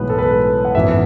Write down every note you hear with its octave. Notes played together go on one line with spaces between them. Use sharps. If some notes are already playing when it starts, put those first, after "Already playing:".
Already playing: B1 A2 E3 G#3 B3 B4
A4
B4
F#5
G#1 F#2 E3 B3 E5